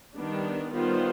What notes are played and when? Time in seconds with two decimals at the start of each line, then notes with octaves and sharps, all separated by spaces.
0.16 D#3 G3 B3 D4
0.73 D#3 G3 B3 F4 C5